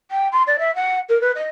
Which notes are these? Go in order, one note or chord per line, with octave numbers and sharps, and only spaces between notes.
G5
C6
D5
E5
F#5
A#4
B4
D#5